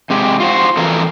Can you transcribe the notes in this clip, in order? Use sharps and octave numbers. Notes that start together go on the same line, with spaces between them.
C3 G#3 G4
F4 F#4 C5
F2 E3 A4 A#4